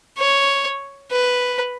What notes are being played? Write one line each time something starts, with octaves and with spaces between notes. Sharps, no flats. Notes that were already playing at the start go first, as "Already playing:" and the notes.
C#5
B4